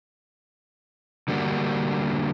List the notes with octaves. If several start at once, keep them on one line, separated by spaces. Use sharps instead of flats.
D3 G3 A#3 D4 F#4